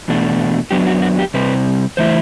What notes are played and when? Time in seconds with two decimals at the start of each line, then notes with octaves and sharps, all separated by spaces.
0.08 E2 B2 A3 D4
0.71 F#2 F#3 B3 D4 G4
0.87 F#4
1.02 F#4
1.19 G4
1.34 C3 G3 C4 B4
1.97 E3 A3 E4 C5